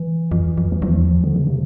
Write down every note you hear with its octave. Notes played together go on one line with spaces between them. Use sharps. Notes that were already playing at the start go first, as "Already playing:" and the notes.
Already playing: E3
F2
F2
E3
E2 F3
D3
C#3
C3